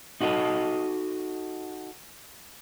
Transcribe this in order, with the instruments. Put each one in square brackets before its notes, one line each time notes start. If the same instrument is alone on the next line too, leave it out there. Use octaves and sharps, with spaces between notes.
[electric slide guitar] D#4 F#4 A4 D#5